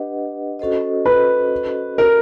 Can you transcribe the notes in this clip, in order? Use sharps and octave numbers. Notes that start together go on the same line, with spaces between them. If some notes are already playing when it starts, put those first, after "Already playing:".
Already playing: D4 G4 B4 D#5 F#5
C#4 F#4 A4 C5 D#5
B4
A#4